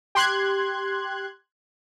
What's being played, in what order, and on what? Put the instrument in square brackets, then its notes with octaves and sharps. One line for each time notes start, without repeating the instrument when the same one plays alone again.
[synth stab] G4 C6 F#6 G#6